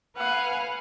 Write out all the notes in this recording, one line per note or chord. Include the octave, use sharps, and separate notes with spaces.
B4 F5 F#5 G#5